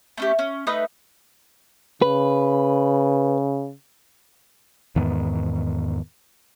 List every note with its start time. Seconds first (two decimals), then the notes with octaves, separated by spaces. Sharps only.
0.17 A3 C#4 G4
0.39 C#4
0.67 A3 D#4 B4 D#6
2.02 C#3 B4
4.96 E2 G#2 D#3 B3